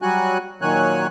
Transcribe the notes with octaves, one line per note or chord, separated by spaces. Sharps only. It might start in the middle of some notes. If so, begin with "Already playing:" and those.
F#3 G3 F#4 G#5 F#6
A#2 D#3 F#3 C#5 G#5 F#6